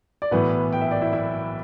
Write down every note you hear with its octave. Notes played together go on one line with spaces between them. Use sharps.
D5
B1 A2 E3 B3 B4
G5
E5
D5
E4 E5
E4 E5